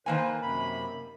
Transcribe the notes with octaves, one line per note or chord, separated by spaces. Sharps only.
D#3 A#3 B4 C5 G#5
F#2 C3 B5